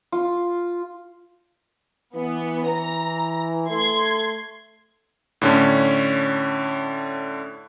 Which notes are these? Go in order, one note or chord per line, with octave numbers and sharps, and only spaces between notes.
F4
E3 B3
A#5
A3 C6 G#6
A2 D3 C#4